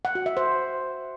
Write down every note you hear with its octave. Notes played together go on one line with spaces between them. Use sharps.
F#5
F#4
E5
C5